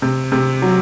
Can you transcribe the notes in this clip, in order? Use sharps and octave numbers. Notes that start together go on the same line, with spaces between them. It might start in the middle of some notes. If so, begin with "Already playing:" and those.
C3
C3
F#3